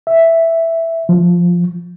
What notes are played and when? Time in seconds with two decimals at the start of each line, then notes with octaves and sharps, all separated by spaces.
0.07 E5
1.09 F3